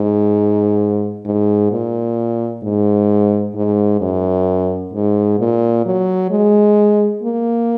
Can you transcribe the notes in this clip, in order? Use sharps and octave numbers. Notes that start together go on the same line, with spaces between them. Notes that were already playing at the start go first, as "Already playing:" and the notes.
Already playing: G#2
G#2
A#2
G#2
G#2
F#2
G#2
A#2
F#3
G#3
A#3